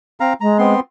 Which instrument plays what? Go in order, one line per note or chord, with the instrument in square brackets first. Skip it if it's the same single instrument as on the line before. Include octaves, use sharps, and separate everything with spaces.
[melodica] C4 F5 A#5
[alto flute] G#3 [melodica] A#5
[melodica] B3 C4 C6